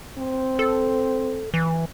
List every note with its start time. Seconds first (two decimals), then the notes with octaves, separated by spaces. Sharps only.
0.18 C4
0.59 A4
1.54 E3